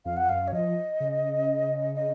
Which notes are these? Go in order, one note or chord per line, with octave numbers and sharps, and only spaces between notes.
F2 F5
F#5
F#2 F5
C#5
F3 D#5
C#3
D#5